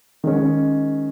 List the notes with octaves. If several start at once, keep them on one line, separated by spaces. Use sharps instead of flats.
D#3 G#3 C#4